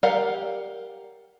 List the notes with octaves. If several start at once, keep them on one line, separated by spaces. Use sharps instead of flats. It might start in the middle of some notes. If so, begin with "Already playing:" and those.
G4 A#4 D5 F5 F#5